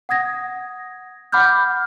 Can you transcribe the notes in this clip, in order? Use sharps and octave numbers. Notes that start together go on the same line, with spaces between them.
F#5 D#6 G#6 A#6
F#5 B5 D6 F6 G6